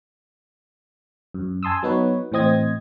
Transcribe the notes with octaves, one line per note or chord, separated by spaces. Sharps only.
F#2
G#5 A5 C6 D#6 E6
F#3 B3 D#4 B4 C#5
A2 E3 C4 D#5 G#6